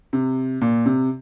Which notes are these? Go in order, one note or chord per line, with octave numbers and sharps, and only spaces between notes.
C3
A#2
C3